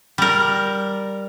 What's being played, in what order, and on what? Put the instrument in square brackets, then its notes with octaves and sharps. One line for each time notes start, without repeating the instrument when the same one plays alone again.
[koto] G3 A#4